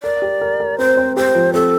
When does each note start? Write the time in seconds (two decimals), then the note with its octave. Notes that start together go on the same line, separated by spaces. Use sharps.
0.03 A#4 D5
0.22 G4
0.41 A#4
0.60 A#4
0.78 C4 C5
0.97 C4
1.17 G4 C5
1.35 F3
1.54 C4 A4